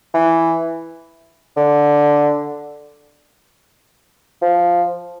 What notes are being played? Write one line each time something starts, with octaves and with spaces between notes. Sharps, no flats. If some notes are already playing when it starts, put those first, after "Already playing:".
E3
D3
F3